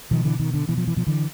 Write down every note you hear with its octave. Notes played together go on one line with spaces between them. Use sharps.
B2 D#3 F3
D3 E3
B2 D#3
D3
B2 E3
F3
E3
B2 F3
D3 E3